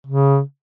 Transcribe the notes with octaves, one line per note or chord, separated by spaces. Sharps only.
C#3